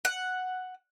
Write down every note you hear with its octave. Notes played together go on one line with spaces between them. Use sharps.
F#5